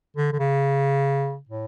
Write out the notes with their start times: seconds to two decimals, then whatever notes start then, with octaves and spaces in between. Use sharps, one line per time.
0.17 D3
0.33 D3
0.40 C#3
1.49 A2